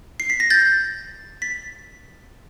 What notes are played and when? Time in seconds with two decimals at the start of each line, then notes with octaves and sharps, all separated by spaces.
0.20 C7
0.30 B6
0.40 A#6
0.50 G6 A6
1.42 A6 B6